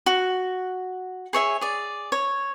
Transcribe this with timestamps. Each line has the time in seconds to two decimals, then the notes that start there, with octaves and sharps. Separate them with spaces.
0.06 F#4
1.33 G#4 C#5 E5 G#5
1.61 G#4 D5
2.12 C#5